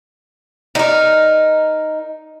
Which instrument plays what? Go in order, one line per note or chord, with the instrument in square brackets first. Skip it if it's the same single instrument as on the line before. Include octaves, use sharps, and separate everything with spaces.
[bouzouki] D#4 A#4